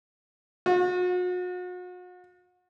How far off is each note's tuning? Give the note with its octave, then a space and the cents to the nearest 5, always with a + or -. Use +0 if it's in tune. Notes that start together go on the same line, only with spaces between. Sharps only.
F#4 -40